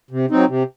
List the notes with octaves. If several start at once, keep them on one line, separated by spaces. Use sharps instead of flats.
C3
F#3 C4 D#4
C3